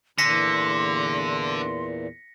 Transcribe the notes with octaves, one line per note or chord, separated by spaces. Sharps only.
E2 A#2 D3 C6 A#6 B6 C#7